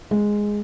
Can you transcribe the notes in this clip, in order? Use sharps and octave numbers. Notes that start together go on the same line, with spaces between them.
G#3